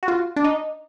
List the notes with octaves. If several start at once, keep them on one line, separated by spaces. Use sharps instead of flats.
F#4
F4
D4
D#4